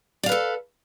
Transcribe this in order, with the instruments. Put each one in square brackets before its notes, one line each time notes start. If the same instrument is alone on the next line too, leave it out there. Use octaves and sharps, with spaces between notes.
[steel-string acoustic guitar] D5
F5
B4
A4